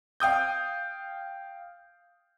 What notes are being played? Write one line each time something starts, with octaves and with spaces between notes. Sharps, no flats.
F5 G5 D#6 G6